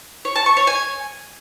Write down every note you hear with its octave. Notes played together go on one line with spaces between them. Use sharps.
C#5
A5
C#6
C#5
G#5